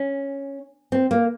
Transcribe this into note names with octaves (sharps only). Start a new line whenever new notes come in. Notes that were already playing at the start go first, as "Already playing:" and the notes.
Already playing: C#4
C4
A#3